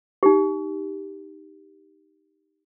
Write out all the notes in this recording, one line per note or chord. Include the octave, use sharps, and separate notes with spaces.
D#4 G4